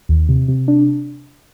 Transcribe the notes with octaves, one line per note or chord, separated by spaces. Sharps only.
D#2
C3
C3
D4